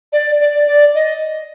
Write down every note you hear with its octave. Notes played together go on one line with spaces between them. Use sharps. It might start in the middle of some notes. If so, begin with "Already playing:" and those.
D5
D5
D5
D#5